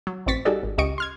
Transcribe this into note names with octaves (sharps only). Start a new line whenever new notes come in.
F#3
A1 F#2 C4 C#6 A6 B6
G3 D#4 F#4 G#4 A4 D5
G#1
C#2 G4 D#5 C#6 D7
C6 F6 G#6